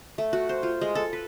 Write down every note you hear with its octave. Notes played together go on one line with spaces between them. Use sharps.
A3
F#4
C5
F4
G#3
A4
B4